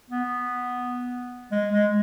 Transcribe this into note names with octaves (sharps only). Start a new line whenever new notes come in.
B3
G#3
G#3